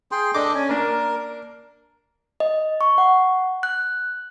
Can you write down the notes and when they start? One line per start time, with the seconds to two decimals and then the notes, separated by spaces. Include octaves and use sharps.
0.11 G#4 G5 C6
0.34 D4 A4 D#5 D6
0.55 C#4 G#5
0.69 A#3 D4 A#4
2.40 D#5
2.81 C#6
2.98 F#5
3.63 F#6